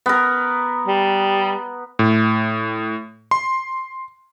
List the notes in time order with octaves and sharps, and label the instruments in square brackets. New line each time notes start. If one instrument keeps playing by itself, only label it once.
[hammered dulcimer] B3 A#4
[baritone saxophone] G3
[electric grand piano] A2
C6